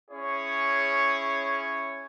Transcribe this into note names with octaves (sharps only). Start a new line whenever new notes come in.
C#4 E4 G#4 C#5